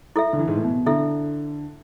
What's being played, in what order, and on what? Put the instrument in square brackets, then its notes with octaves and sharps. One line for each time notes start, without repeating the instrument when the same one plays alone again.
[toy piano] E4 A4 E5
[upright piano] D3
E3
G#2
A2
B2
[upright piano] D3 [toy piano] E4 A4 E5